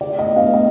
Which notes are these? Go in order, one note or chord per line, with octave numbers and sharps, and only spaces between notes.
D5
D#5
F5
D#5